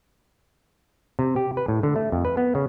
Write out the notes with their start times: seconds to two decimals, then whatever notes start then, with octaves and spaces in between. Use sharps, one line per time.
1.19 C3
1.36 G4
1.57 B4
1.68 A2
1.83 D3
1.96 A3
2.12 F2
2.25 B4
2.37 B3
2.55 C#3